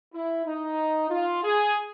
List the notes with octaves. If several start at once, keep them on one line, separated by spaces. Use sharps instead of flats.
E4
D#4
F4
G#4